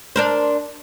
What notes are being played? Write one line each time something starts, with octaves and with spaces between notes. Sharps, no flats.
D4 A#4 C5